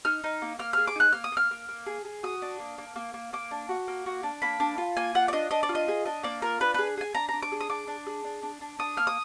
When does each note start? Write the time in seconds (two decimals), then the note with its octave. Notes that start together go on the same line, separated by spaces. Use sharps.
0.05 D#4 F6
0.24 D#4
0.42 A#3
0.59 A#3 F6
0.73 G#4 F6
0.87 D6
0.96 D#4 F#6
1.12 A#3 F6
1.24 D#6
1.32 A#3 F6
1.51 A#3
1.69 A#3
1.86 G#4
2.05 G#4
2.23 F#4 D#6
2.42 D4
2.60 A#3
2.78 A#3
2.96 A#3
3.14 A#3
3.33 A#3 D6
3.51 D4
3.69 F#4
3.88 A#3
4.06 F#4
4.23 D4
4.42 A#3 B5
4.60 D4
4.78 F4
4.97 A#3 G#5
5.15 F4 F#5
5.28 D5
5.33 D4 D#5
5.51 D4 D#5
5.63 D5
5.69 F4
5.75 D#5
5.88 G#4
6.05 D4 D#5
6.23 A#3 D5
6.42 F4 A#4
6.60 D4 B4
6.74 G#4 B4
6.98 G#4 G#5
7.15 D4 A#5
7.29 D4 A#5
7.42 D6
7.52 G#4
7.61 D#6
7.70 D4 D6
7.87 D4
8.07 G#4
8.24 D4
8.43 D4
8.61 D4
8.79 D4 D#6
8.97 A#3 F6
9.07 D#6